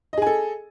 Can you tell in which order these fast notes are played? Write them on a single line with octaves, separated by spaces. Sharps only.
D#5 G#4 G#5 A4